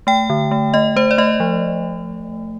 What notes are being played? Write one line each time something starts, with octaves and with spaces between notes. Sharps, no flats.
A3 G5
D3
A3
A3 D#5
A3 C5
D5
A3 D#5
F3